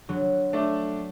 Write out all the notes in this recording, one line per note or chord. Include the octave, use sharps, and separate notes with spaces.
D3 F#3
A3 D4